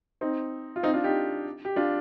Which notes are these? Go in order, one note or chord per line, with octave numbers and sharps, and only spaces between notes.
C4 D#4
F4
C4 D#4
D4 F4
D#4 G4
G4
D4 F4